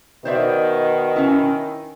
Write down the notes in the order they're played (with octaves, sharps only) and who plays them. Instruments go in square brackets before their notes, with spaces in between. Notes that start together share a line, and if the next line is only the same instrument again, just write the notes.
[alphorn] B2 [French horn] D#3 [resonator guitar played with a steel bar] C5 D5 E5
[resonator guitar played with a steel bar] C#4 E4